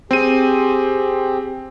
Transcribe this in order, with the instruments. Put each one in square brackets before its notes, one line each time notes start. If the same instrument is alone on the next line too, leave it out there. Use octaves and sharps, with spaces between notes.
[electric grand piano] C4 D#7 [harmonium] G4 G#4